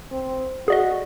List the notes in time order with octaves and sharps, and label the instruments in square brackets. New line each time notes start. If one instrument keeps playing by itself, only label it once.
[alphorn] C4
[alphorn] F#4 [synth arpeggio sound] G#4 D5 D#5